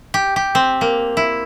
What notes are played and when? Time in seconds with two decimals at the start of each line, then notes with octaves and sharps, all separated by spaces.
0.14 G4
0.36 G4
0.55 C4
0.81 A#3
1.17 E4